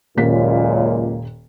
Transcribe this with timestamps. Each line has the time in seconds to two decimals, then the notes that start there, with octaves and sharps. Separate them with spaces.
0.17 D#1 C#2 F#2 A#2 A#3 B6